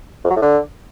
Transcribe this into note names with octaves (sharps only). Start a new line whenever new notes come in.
F2
F#3
A2
D3